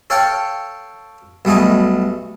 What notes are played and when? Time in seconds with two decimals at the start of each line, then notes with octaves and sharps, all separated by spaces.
0.10 A4 C#5 F5 G5 A5 C#6
1.45 B1 G3 A3 G#4 D#5